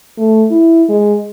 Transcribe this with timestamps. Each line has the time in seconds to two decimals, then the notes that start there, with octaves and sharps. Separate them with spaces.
0.18 A3
0.51 E4
0.89 G#3